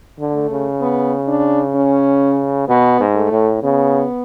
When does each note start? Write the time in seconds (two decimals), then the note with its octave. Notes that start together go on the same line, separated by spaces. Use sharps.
0.19 D3
0.34 A3
0.50 C#3
0.81 B3
1.28 D4
1.74 C#4
2.68 B2 B3
3.00 G#2
3.15 A3
3.31 A2
3.61 C#3 B3